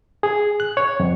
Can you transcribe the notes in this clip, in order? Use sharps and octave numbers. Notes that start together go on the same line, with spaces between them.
G#4
F#6
C#5
F2